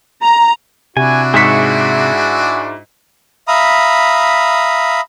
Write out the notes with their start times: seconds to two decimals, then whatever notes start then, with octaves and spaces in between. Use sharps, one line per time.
0.24 A#5
0.97 C3 D4 E4 F#4 G#5
1.34 G#2 G#4 E5 C#6 B6
3.48 E5 F5 A#5 B5 D#6